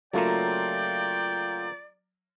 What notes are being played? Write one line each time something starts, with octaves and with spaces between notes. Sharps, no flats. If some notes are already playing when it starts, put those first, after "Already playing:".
C#3 F#3 A3 A#3 F4 D5 G5 A#5